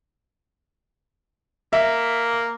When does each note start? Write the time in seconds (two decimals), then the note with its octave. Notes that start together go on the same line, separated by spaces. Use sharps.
1.73 A#3 E5